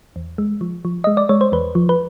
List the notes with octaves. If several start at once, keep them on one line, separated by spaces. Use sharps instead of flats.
E2
G#3
F3
F3
G#3 D#5
D5
G#3 C#5
C5
E2 B4
F3
B4